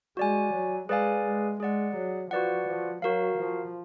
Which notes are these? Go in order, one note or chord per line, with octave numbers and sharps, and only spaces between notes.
G#3 F#4 D5 G#5
F#3
G#3 G#4 B4 D5 F5 G#5
G#3
G#3 G#4 D5 F#5
F#3
F3 F#4 B4 D5 F#5
F3
F#3 F#4 A#4 F5
F3